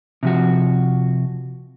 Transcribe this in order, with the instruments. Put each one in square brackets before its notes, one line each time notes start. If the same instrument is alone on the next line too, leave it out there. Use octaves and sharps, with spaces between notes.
[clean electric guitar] C3 F3 F#4